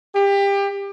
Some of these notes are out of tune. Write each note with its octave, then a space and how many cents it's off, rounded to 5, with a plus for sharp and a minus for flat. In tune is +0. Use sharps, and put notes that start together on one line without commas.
G4 +25